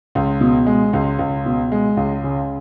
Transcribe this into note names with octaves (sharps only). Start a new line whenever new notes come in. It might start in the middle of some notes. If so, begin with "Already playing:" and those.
C#2
B2
G#3
C#2
C#2
B2
G#3
C#2
C#3